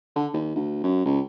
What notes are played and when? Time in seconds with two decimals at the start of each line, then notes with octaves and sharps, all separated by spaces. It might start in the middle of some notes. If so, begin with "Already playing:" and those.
0.15 D3
0.33 D#2
0.55 D2
0.83 F#2
1.05 C#2